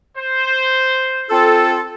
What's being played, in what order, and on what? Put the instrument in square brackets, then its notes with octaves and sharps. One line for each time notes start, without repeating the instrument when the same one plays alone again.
[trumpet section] C5
[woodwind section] C4 F4 A4